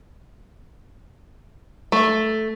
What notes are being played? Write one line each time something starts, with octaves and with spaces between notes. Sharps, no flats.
A3